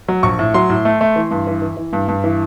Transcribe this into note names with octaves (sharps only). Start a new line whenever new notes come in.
F#3
A#1 C#6
A2
F#3 C6
A2
A3
A3
E3
G2
E3
E3
E3
G2
G2
E3